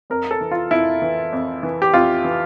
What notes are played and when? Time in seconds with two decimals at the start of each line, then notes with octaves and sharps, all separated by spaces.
0.10 F2 A#4
0.31 A4
0.41 E3
0.52 F4
0.71 F2 E4
1.02 E3
1.33 F2
1.63 E3
1.82 G4
1.93 F2 F4
2.25 E3